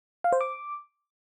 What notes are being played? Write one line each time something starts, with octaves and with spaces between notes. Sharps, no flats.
F5
C5
D6